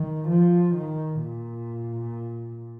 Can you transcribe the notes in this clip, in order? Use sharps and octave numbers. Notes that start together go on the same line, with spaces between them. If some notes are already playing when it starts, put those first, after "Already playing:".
Already playing: D#3
F3
D#3
A#2